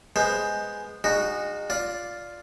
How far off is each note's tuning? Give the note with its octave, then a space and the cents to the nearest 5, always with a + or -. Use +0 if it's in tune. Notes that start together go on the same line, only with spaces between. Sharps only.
G#3 +0 B3 +0 C5 +5
G#3 -30 D#4 -20 F#4 +0
F4 +0 D5 +0